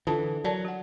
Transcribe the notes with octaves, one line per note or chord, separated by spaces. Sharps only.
D3 E3 F4 A4 A5
F#3 A#4 D5 A5
F#4 F#5